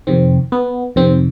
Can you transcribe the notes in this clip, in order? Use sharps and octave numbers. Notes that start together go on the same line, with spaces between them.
F2 C3 D#3 C4
B3
F2 C3 D#3 C4